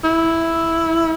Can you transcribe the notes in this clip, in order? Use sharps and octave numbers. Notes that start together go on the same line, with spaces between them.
E4